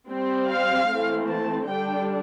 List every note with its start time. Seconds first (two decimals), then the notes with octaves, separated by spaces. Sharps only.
0.08 G3 C4
0.48 F5
0.89 E3 A3 C4
1.28 A5
1.68 D3 G3 D4 G5